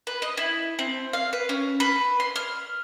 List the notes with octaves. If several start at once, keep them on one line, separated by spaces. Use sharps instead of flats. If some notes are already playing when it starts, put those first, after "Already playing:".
B4
D#5
E4
C4
F5
B4
C#4
B4
C6
F6